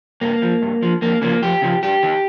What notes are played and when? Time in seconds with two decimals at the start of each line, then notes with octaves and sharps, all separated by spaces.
0.21 G2 A#3
0.42 F3
0.62 G2
0.82 F3
1.02 F2 A#3
1.22 C#3 F3 A#3
1.42 F2 G4
1.62 C#3 F3
1.83 G2 G4
2.03 D#3